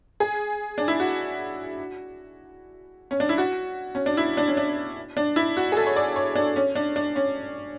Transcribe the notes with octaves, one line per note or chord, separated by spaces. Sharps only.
G#4
D4
E4
F#4
C#4
D4
E4
F#4
C#4
D4
E4
D4
C#4
D4
D4
E4
F#4
G#4
A4
C#5
D5
C#5
D4
C#4
D4
D4
C#4